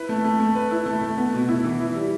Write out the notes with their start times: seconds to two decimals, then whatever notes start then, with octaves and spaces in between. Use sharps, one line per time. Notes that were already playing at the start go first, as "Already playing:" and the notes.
Already playing: E4 B4
0.09 A3
0.25 A3
0.40 A3
0.55 B4
0.71 E4
0.86 A3
1.02 A3
1.18 B3
1.34 B2
1.49 E4
1.64 E3
1.80 E4
1.95 G3